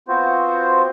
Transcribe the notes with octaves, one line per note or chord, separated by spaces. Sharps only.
B3 C4 F4 F#4 C5